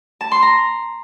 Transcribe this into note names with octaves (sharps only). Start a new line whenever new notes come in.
A5
C6
A#5